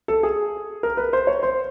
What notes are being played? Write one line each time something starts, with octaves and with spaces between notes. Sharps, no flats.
A4
G#4
A#4
B4
C5
C#5
C5